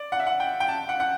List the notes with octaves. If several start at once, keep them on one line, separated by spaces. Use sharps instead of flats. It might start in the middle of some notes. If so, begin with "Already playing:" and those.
Already playing: D5
F#5
E5
F#5
G5
G5
A5
F#5
F#5